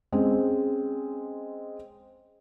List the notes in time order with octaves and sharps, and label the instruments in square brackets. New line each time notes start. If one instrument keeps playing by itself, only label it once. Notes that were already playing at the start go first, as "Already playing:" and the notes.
[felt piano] G#3 C4 C#4 G#4